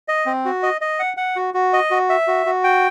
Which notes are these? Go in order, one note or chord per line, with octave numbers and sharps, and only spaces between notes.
D#5
C4
F#4
D#5
D#5
F#5
F#5
F#4
F#4
D#5
F#4
E5
F#4
F#4
G5